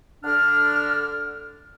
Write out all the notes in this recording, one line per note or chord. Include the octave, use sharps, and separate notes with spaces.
D3 D4 F6